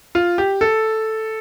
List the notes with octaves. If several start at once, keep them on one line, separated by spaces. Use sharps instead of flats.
F4
G4
A4